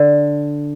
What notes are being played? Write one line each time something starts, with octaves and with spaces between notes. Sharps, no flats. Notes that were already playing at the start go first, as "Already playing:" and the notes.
Already playing: D3